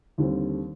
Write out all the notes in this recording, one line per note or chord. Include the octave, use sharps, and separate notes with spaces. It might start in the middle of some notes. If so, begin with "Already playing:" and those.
D#2 D3 G3 C4